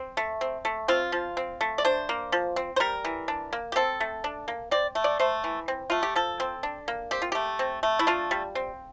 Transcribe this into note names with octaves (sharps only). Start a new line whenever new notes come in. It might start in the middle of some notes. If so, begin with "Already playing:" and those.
Already playing: C4
A3
C4
A3
C4 F4
F3
C4
A3
D5
D4 C5
A#3
F3
C4
C5
G3 A#4
E3
D4
A#3
G4
C4 A4
A3
D4
A#3
C4 D5
A3
D5
A3 C5
E3
C4
A3 F4
G4
F3 A4
C4
D4
A#3
C4 G4
F4
A3 G4
C4
A3
E4
D4 F4
G3
C4